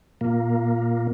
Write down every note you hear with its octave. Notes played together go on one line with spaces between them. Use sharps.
A#2 A#3